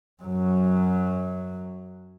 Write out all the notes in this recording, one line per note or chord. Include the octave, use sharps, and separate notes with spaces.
F#2 F#3